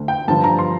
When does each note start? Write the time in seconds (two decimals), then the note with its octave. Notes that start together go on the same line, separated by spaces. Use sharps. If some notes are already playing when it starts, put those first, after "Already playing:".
Already playing: D2 D3 A3
0.08 G5
0.28 G2 D3 F3 A5
0.44 A#5
0.59 C6